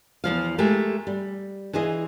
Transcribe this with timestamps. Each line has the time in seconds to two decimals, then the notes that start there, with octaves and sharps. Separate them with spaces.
0.24 E2 D#3 F3 F5
0.58 G#3 A3 G4 A#4
1.07 G3
1.73 E3 F4 G#4 D#5